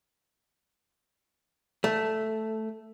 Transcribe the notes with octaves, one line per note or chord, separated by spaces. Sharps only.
A3